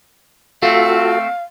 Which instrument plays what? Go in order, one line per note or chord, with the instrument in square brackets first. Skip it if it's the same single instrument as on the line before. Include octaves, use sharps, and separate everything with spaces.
[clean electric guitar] A3 C4 [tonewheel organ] F4 F#4 A4 [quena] F5